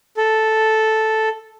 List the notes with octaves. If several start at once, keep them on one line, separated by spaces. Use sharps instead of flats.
A4